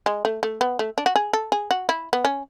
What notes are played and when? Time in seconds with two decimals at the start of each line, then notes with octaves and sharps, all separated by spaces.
0.06 G#3
0.25 A3
0.43 A3
0.61 B3
0.79 A3
0.98 D4
1.06 F#4
1.16 G#4
1.33 A4
1.52 G#4
1.71 F#4
1.89 E4
2.13 B3
2.25 C#4